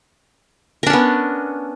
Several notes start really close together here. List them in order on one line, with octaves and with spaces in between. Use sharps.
A#4 D4 C#4 B3